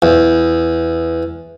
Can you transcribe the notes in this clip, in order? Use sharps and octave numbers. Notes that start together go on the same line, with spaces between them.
E2